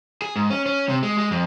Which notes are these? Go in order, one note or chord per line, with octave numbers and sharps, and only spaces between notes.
G#4
G#2
C#4
C#4
C3
G#3
G#3
F2